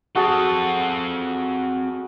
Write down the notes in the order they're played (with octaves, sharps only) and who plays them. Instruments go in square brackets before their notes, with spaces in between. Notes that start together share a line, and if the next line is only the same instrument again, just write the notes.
[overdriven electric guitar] C4 A4 [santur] F#4 G#4 A5